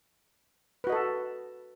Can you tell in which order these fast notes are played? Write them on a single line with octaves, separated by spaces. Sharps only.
B4 F#4 D#5 A4